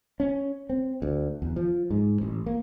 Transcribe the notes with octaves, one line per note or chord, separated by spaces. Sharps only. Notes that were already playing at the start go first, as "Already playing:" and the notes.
C#4
C4
D2
E2
F3
G#2
A1
A#3